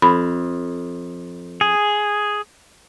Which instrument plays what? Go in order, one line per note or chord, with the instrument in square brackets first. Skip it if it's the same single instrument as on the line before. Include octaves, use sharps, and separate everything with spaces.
[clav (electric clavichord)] F2 [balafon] B5
[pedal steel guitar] G#4